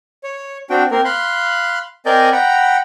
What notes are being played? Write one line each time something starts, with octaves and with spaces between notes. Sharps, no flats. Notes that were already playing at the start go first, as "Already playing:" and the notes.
C#5
C4 D4 F#4 G5
A#3 C4 A#4
F5 B5 C6 F#6
C4 A#4 D5 D#5 G#5 G6
F#5 G5 A#5 B5